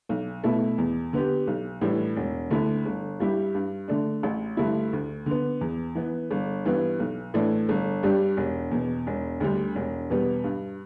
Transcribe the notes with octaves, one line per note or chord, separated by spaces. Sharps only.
B1
B2 A3 E4
E2
D3 B3 G4
B1
A2 E3 G3 D4
E1
D2 D3 A3 E4
G1
G2 G3 E4 G4
G2
D3 A3 D4
A1
G2 D3 A3 E4
D2
D3 B3
E2
E3 B3
G1
G2 E3 B3
B1
A2 E3 A3 D4
G1
G2 G3 D4 G4
E1
E2 B2
E1
D2 D3 G3
E1
E2 B2 G3 B3
G2